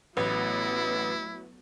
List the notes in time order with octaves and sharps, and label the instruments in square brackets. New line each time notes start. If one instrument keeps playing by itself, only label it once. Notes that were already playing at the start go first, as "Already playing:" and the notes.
[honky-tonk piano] A1 [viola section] F#3 A3 B3 [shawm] E4 [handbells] B4